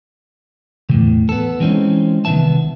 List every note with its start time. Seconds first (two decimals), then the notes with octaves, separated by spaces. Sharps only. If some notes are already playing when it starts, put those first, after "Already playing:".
0.89 E2 A2 C#3
1.29 B3 A4
1.60 E3 G#3 C4 C#4 D#4
2.25 C2 D#3 G#3 B3 E5 A5